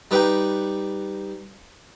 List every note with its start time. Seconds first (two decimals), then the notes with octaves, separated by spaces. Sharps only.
0.11 G3 D#4 B4 G5